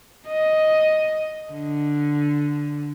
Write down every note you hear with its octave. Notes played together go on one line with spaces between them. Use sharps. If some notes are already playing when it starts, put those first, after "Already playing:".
D#5
D3